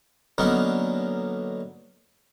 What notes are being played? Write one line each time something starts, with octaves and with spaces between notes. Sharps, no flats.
D3 F#3 A#3 B3 C#4 D#4